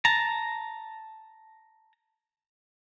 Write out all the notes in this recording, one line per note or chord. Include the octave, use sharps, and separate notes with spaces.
A5 A#5